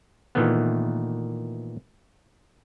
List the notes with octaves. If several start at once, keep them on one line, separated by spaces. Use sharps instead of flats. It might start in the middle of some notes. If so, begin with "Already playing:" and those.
A#2 D#3 E3 A3 B3